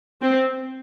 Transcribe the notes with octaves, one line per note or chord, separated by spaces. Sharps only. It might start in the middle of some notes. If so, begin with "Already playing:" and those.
C4